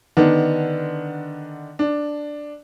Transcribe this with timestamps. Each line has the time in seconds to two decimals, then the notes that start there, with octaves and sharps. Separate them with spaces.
0.17 D3 D#3 B3 D4
1.79 D4